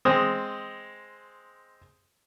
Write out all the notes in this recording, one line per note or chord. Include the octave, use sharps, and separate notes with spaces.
G#3 C4 D#6